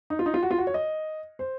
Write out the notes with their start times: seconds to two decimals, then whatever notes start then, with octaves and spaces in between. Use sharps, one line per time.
0.10 D#4
0.19 F4
0.26 D#4
0.34 F4
0.43 F#4
0.51 F4
0.58 F#4
0.67 C#5
0.74 D#5
1.39 C5